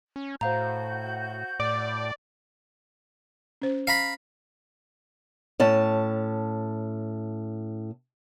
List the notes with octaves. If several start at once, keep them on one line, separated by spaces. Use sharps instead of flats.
C#4
A2 F#4 C5 F5 A#5 G6
A2 D5
C#4 C5
F5 A#5 B5
A2 C#4 A5